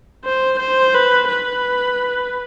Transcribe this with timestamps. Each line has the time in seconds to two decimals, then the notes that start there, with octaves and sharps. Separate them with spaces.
0.25 C5
0.59 C5
0.94 B4
1.28 B4